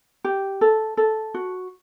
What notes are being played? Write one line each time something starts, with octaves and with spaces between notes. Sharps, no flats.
G4
A4
A4
F#4